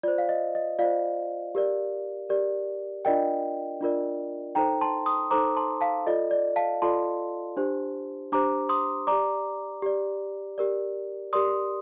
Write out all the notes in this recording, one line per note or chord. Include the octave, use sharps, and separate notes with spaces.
F4 C5 D5
F5
D#5
D#5
F4 C5 D5 F5
G4 A#4 D5
G4 A#4 D5
D4 F4 A#4 D5 D#5 G5
D4 F4 A#4 D5
D#4 A4 C5 G5 A#5
A5 C6
C6 D#6
D#4 A4 C5 A#5 D6
A5 C6
F5 A5
F4 A4 D5 D#5
D5
F5 A5
F4 A4 D5 A5 C6
D4 G4 C5
D4 G4 C5 A#5 D6
C6 D#6
G4 D5 A#5 D6
G4 D5
G4 A#4 D5
G4 A#4 D5 C6 D#6